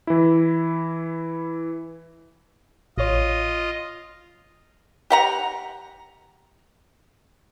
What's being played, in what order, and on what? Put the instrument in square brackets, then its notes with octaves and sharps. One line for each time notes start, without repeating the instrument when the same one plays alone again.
[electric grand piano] E3 E4
[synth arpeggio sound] A1 C#5 [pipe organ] F4 D#5
[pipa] G4 F#5 A#5